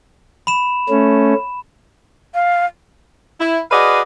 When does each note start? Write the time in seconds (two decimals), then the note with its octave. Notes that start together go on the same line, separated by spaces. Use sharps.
0.47 B5 E7
0.89 A3 C#4
2.34 F5
3.40 E4
3.71 F#4 G#4 B4 D5 D#5 F5